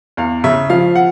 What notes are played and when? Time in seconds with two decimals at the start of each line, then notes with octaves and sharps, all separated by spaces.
0.17 E2 F5
0.44 C#3 E5
0.70 F3 F5
0.95 F#5